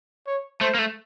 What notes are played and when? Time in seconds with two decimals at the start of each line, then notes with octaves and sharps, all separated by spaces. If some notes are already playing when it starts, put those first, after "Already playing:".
0.27 C#5
0.61 A3 C5
0.75 A#3
0.79 A3